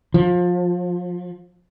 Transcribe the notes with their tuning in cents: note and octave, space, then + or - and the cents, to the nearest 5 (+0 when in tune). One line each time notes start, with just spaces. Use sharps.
F3 +25